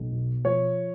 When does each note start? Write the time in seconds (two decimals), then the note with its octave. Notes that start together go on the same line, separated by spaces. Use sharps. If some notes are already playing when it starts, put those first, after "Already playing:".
Already playing: B1
0.12 B2
0.45 F3 C#5